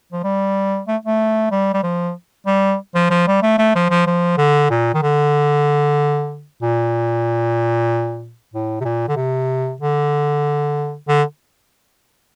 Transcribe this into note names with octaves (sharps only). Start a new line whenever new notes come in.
F3
G3
A3
A3
G3
G3
F3
G3
F3
F3
G3
A3
A3
F3
F3
F3
D3
A#2
D#3
D3
A#2
A2
C3
A#2
D3
C3
D3
D3